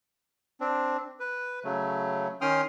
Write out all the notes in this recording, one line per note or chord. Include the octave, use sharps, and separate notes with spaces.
C4 D4
B4
C#3 F#3 A3
D#3 C#4 G5 C6 D#6 F6